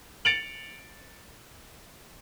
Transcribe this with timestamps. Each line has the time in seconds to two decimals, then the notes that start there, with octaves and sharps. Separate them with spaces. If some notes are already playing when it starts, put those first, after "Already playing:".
0.25 A6 C#7 D7 F7 F#7